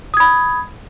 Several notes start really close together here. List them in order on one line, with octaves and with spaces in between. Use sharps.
D#6 G#6 B5